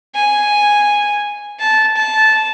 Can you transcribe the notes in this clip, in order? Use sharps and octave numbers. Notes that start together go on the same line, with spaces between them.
G#5
A5
A5